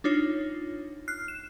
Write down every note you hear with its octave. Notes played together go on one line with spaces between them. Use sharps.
D4 D#4 F4 C#5
F6 F#6 C7
E7